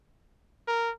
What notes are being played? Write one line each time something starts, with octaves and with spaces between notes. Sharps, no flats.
A#4